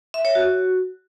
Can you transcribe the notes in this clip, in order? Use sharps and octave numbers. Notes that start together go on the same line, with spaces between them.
E5
C#5
F#4